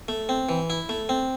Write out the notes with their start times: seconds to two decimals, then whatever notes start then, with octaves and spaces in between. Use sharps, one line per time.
0.08 A3
0.29 C4
0.49 E3
0.70 E4
0.89 A3
1.09 C4